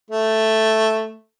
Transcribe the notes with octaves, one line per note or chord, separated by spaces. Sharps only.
A3